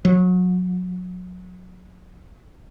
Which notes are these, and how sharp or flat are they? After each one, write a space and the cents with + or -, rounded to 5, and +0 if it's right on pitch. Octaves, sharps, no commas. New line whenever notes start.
F#3 -30